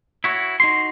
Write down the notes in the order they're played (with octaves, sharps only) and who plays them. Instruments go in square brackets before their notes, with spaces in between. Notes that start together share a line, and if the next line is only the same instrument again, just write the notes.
[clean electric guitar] E4 F#4 C#5
D#4 F#4 C6